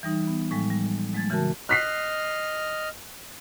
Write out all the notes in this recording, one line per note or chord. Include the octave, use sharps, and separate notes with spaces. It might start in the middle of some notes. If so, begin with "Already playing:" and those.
E3 G3 D#4
B3
A2 F3 G3 G#3
G3
F#3 G#3 A3 G#6 A6
C#3 E3 F#4 A#4 A5
D#5 F6 F#6 B6 C7